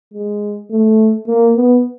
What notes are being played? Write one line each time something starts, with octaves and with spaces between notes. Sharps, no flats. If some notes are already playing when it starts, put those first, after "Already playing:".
G#3
A3
A#3
B3